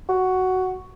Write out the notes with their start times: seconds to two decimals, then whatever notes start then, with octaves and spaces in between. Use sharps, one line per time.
0.09 F#4